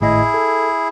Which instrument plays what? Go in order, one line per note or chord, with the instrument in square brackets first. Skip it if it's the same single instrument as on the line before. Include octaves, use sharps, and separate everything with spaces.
[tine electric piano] G#1 A2 D#5 [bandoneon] E4 G#4
[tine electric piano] A4